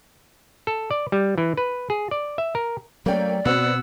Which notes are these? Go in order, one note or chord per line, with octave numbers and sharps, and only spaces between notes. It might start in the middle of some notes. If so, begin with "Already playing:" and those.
A4
D5
G3
E3
B4
G#4
D5
E5
A#4
F#3 A3 A#3 C#4 D5 G5
B2 B3 C4 F#4 F#5 E6